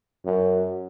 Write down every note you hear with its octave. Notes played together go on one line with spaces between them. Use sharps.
F#2